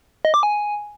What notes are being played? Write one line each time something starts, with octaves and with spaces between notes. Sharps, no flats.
D#5
D6
G#5